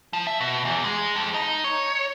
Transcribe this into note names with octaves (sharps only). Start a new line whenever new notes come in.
F3
E5
B2
E2
G#3
F2
D#4
C#5